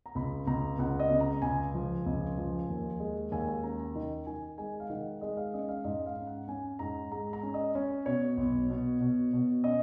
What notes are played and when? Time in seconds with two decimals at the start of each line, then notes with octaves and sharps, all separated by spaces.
0.06 A#5
0.15 C#2 B5
0.47 C#2 A#5
0.79 C#2 F#5
1.00 D#5
1.11 C#3
1.21 A#5
1.42 C#2 G#5
1.75 F3
2.06 C#2
2.38 F3
2.69 D#2
3.00 G#3
3.32 D#2 G#5
3.48 G#5
3.63 C#4 A#5
3.80 A#5
3.95 D#3
4.26 D#3 G#5
4.58 G#3 G#5
4.80 F5
4.90 D#3 F#5
5.21 G#3 D#5
5.37 F5
5.54 C#4 D#5
5.69 F5
5.84 G#2 D#5
6.06 F5
6.17 C#4
6.27 F#5
6.48 C#4 G#5
6.79 G#2 A#5
7.12 G#3 A#5
7.33 A#5
7.43 C#4
7.54 D#5
7.75 C#4 C#5
8.06 B2 C#5
8.37 B1
8.70 B2
9.01 B2
9.33 B2
9.64 C#4 D#5